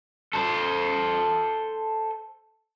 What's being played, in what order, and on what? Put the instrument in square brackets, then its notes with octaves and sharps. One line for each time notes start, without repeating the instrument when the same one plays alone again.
[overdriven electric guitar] A4 C5